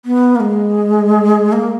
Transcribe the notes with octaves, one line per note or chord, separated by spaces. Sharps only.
B3
A#3
G#3
A#3